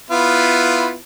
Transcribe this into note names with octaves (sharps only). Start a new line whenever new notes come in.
B3 E4 F4